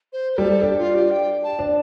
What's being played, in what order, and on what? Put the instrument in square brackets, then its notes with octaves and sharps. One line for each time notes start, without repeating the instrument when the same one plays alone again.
[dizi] C5
C5
[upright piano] G3 [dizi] A4
[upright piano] D4 [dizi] G4
[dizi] F4
G4
G5
A5
[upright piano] D4